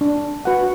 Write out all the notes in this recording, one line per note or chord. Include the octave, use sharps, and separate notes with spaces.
D4
F#4 B4 F#5